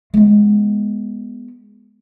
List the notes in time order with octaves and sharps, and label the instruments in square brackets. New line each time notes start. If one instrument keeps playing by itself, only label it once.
[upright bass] G#3 B3